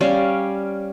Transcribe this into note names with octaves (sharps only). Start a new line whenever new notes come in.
G3 C#4 D5 F5